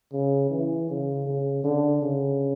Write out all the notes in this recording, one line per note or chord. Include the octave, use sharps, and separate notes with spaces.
C#3
E3
C#3
C#3
D3
C#3